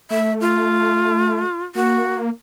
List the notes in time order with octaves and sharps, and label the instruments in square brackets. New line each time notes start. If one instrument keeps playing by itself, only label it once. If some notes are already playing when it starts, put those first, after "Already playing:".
[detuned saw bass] A3 [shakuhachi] E5
[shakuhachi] F4
[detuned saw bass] A#3 [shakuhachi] F#4